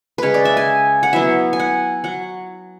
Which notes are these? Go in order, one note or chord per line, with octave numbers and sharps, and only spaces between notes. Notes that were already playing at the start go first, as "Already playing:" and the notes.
C#3 G#3 C#4 B4 C#5
D5
E5
G#5
F#5
F#3 B3 E4 E5
G#5
F#5
F#3 F#5